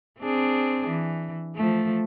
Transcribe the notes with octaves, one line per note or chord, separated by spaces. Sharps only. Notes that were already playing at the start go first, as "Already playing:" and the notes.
C4 D4 G#4
E3
F3 A3